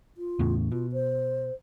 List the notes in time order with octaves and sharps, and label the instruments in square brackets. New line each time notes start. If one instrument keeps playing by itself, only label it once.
[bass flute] F4
[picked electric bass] E2 A2 C#3
[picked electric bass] B2 [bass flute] F4
[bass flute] C5